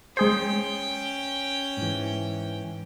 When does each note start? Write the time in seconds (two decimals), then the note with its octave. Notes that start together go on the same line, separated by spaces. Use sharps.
0.17 G#3 C#4 G#4 C5 G5
1.77 G#2 E3